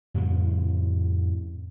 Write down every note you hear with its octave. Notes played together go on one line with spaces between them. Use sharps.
F2 A2 C#3 F3